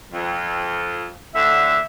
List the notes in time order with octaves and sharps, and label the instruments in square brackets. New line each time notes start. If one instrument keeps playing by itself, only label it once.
[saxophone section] F2
[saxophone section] A2 D3 [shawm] E5